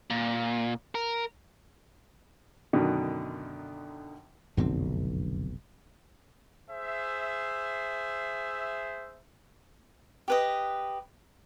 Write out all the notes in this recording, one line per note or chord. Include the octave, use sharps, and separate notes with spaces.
A#2
A#4
F#2 B2 D3 D#3
F1 B1 F#2 D3 C4
G#4 C5 E5
G4 B4 D#5